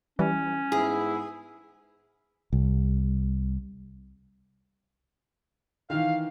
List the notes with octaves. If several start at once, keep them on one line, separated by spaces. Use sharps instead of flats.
E3 G3 C#4
G#2 B3 E4 G#4
C2
D#3 E3 F5